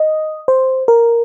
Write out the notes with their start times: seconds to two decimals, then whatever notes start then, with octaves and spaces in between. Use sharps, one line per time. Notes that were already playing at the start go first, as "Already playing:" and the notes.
Already playing: D#5
0.48 C5
0.88 A#4